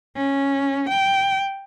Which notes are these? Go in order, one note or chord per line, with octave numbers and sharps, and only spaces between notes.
C#4
G5